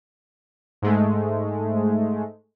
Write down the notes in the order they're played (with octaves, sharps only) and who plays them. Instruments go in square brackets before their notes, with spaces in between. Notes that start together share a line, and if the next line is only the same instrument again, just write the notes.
[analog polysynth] G#2 G#3 A3